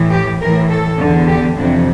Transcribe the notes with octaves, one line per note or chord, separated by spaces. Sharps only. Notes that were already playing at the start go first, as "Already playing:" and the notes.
Already playing: A2 E3
G4
A2 E3 A#4
A4
E2 D3
G4
F2 C3 E3 D4